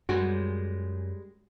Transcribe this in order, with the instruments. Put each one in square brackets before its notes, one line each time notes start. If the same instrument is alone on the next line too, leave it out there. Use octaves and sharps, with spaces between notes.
[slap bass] F#2 [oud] G3 G#3 D5 [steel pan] F#4